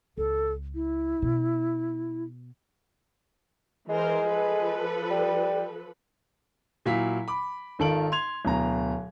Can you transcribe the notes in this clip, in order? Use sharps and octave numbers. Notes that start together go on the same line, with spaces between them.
C#2 A4
E4
B2
E3 G#3 A#4 C5
F3 A4 B4
G3
A#2 F#3 E4 F5 B6
B5 D6
G#1 D#3 F4 A4 D7 F#7
C6 G#6 F7
D1 B2 A#5